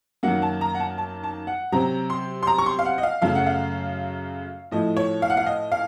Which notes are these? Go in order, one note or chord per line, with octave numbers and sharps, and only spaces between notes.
F#2 D#3 F#3 A#3 F#5
A5
A#5
F#5
A5
A5
A5
F#5
C3 F#3 C4 A#5
C6
C6
A#5
C#6
C6
F5
F#5
D#5
F5
F#2 C#3 F#3 A3 F5
F#5
F5
A2 F3 A3 D#5
C#5
F5
F#5
F5
D#5
F5